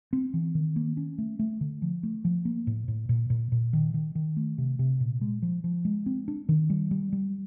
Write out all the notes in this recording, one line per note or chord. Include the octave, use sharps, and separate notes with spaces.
C4
E3
D#3
A#3
C#4
A3
A3
D3
F3
A3
F3
A#3
A2
A2
A#2
A#2
A#2
D#3
D#3
D#3
A3
C3
C3
A#2
G#3
F3
F3
G#3
C4
D4
D#3
G3
G3
G3